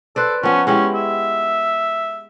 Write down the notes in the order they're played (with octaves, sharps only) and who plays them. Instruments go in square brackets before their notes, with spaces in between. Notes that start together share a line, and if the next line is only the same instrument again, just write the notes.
[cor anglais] A4 [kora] B4 C5 D5
[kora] F3 B3 [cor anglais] C#4
[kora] G#3 E4 G4 [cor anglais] C#4
[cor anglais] E5